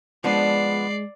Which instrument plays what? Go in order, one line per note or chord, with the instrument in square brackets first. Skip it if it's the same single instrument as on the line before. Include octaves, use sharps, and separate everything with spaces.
[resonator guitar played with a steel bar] F3 B3 D4 [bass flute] G#3 [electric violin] D5 C7